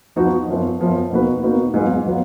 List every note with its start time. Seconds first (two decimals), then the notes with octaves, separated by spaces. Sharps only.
0.16 F3 B3 D#4 F#4
0.48 F#2 F3 B3
0.80 F#2 F3 B3
1.11 B2 A#3 D#4 F#4 B4
1.42 B2 A#3 D#4 F#4 B4
1.74 G#2 F#3 B3 F4
2.06 F#3 B3 F4